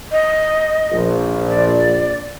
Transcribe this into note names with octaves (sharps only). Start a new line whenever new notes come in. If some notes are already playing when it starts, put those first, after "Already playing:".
D#5
A#1
D5